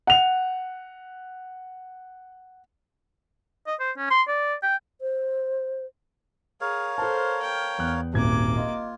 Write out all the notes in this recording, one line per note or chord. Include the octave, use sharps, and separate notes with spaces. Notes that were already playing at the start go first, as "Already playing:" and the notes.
F#5 F7
D#5
C5
C#4
C6
D5
G5
C5
G#4 A#4 C#5 F5
A4 C5 A5
G5
E2 F#6
D#1 G#1 A#3 D6 G#6
F4 D#5